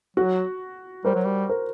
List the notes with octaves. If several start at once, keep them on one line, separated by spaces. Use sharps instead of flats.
F#3 F#4
G3 A#4 C5
F#3
G3
A#4 C5